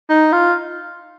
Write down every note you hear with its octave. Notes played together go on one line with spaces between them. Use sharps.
D#4
F4